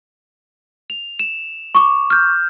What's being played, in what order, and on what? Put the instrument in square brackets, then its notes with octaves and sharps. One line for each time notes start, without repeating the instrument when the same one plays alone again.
[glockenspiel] F7
E7
[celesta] C#6 D6
[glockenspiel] F6 G6